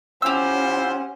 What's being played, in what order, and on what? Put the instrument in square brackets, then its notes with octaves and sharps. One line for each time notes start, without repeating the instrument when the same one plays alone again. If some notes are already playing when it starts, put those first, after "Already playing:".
[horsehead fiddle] C#4 F#5 [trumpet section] E4 F4 C5 [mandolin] G4 E6